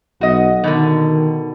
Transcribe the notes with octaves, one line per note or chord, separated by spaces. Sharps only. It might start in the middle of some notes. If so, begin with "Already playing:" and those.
B1 F#4 D#5
B2 D3 D#3